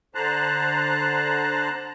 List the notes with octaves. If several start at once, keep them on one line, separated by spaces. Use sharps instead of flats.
D3 C5 A5 A#5 F#6